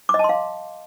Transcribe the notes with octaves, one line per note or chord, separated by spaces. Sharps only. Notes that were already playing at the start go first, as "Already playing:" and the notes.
D6
D#5
A5
C6
F5